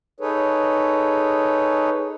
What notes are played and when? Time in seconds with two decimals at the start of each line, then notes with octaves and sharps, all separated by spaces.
0.20 D#4 G#4 A4 B4 C#5